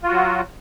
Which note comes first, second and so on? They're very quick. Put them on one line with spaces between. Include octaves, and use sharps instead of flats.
F4 F#4 F#3